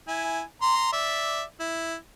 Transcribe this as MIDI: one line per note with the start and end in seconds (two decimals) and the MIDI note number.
0.08 0.42 64
0.08 0.42 80
0.62 0.89 82
0.62 0.89 84
0.93 1.43 74
0.93 1.43 76
1.60 1.95 64